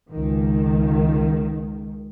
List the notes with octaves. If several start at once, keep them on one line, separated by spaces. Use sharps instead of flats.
C#2 D#3